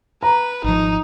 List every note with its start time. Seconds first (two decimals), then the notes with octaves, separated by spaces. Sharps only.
0.23 B4 A#5
0.64 G#1 F3 D#4